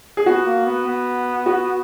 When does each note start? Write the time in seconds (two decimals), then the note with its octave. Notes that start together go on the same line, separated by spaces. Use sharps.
0.17 G#4
0.26 B3 F#4
0.46 A#3
0.66 B3
0.86 B3
1.46 F#4